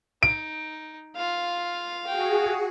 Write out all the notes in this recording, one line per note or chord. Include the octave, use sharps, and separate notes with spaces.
D#4 D7
F4 F5
F#4 G#4 G5